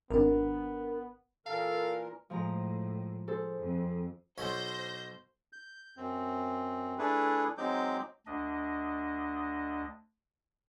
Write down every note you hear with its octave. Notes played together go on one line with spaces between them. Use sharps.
G#1 B3 D4 A#4
A#2 E3 A4 A#4 F5
A2 F3 G#3 A#5
G#4 A4 C5
F2
B1 B2 C5 C#5 G6 A#6
G6
F#2 C4
A3 D4 E4 G#4 A4 B4
F#3 G#3 C4 D#4 D6 G6
D2 D4 D#5